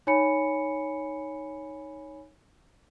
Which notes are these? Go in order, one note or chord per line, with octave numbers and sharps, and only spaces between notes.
D#4 C#5 G#5 B5 C#7